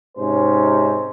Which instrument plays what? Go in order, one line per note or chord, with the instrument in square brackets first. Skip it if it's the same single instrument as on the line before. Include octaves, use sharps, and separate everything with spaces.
[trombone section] G#2 C3 C#4 C5